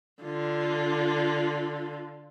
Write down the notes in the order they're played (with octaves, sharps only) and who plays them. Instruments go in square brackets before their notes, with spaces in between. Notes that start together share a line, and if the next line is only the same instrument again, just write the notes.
[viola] D3 F4